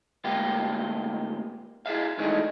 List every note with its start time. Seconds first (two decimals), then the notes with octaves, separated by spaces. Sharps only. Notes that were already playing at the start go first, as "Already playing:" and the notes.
0.24 D2 G#2 A#3 B3 G4 F5
1.86 E4 G#4 E5 F5
2.19 D#3 E3 G#3 A3 D4 D#4